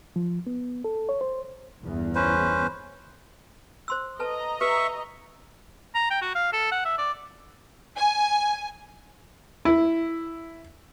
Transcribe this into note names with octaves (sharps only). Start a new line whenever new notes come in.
F3
B3
A4
C#5
C5
G1 E2
C#4 B4 C5
C5 C6 E6
A4 B4 D#5 A5 A#5
G4 B4 E5 C#6
A#5
G5
F#4
F5
A4
F#5
E5
D5
G#5
E4